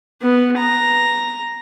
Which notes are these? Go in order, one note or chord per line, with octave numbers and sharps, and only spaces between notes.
B3
A#5